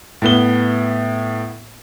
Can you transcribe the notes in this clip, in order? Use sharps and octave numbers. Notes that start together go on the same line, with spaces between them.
A2 B3 G7